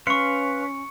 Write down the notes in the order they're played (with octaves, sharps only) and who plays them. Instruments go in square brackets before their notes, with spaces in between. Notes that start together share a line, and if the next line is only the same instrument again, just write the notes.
[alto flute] C#4 [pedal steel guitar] B4 F5 C6 [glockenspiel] C#6 C#7